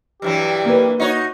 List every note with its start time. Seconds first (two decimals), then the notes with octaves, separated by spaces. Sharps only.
0.22 G2 E3 F#3 G4
0.65 A#3 B4
1.00 D#4 F#4 C#5